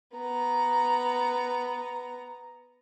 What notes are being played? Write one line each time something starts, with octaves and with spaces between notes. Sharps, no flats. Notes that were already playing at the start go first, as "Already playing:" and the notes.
B3 A#5